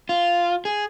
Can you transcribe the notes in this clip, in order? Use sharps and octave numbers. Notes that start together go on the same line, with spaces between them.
F4
G#4